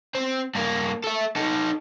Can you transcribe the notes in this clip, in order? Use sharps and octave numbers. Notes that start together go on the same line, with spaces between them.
C4
G2 A#3
A4 E5
D#4 A4